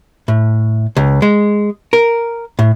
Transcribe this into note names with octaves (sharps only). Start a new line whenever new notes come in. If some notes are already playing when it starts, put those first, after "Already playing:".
A2
C#2
G#3
A#4
A2